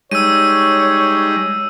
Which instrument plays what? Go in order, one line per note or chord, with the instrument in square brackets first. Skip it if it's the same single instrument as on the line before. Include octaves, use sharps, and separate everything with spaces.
[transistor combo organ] G3 G#3 D#4 [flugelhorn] C#5 [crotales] E6 D#7